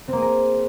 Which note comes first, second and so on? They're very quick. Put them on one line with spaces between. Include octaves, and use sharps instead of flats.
C4 A#3 G#4 A#4